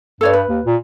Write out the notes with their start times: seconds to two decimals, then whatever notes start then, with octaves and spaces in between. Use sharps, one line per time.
0.21 G2 A4 C#5 D5
0.33 B4
0.49 D#2
0.66 A#2